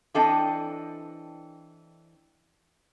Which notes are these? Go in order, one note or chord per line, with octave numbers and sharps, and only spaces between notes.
E3 C4 D4 A4 D#5 G5